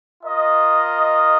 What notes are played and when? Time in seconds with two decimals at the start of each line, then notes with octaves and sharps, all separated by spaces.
0.23 F4 A#4 D#5